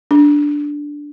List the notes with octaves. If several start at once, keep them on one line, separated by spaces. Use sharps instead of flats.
D4